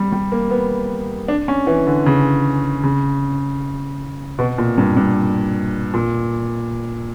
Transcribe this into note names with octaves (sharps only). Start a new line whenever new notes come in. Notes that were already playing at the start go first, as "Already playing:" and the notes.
Already playing: G3
G3
A#3
B3
D4
C#4
E3
D3
C#3
C#3
B2
A#2
G2
G2
A#2